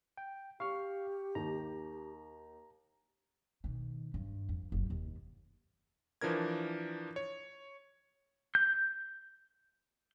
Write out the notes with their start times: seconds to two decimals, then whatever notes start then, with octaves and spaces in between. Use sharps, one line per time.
0.17 G5
0.60 G4 F5 C#6 F6
1.35 D#2 A#5
3.64 B2 D#3
4.14 G2
4.49 F2
4.72 F#1 G3
4.90 D#2 C3
6.21 E3 F3 D4 A#4 G#6
7.16 C#5
8.55 G6